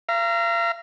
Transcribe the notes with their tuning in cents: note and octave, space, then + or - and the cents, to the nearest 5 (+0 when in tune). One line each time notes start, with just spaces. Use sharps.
F5 -40 A#5 +0